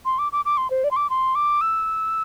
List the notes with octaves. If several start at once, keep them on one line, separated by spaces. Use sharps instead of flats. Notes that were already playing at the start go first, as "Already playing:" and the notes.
C6
D6
D6
D6
C6
C5
D5
C6
D6
C6
D6
E6